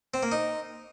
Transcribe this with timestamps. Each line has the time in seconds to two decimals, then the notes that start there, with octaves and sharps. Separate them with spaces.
0.14 C4
0.23 A#3
0.32 D#4